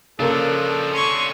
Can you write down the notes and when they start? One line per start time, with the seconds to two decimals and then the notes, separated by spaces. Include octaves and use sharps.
0.19 C#3 F3 A#3 D4 A4
0.93 D3 C#4 C6 C#6